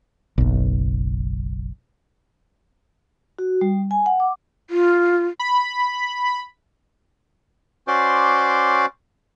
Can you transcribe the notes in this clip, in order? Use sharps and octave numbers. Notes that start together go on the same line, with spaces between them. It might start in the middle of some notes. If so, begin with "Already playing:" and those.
F#1 B1
F#4
G3
G#5
F#5
D6
F4
B5
C#4 F#4 C5 D5 C6 D6